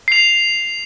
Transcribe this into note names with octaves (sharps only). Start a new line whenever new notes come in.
C7 F7